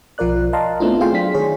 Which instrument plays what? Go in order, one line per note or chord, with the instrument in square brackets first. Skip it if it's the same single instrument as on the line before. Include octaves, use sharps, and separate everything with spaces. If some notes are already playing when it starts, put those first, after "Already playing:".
[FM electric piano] B1 F3 F4 A#4 D5 F#6
D#5 F5 A5 A#5 C6
A3 B3 C4 D4 E4 F4
C4 F4 G#4 F5 G5 C6
F#3 D4 B6
D#3 G#4 C#5